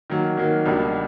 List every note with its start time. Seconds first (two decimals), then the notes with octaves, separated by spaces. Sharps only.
0.10 D#3 F#3 A#3
0.37 D#3 F#3 A#3
0.66 C#2 B2 G3 A#3 D4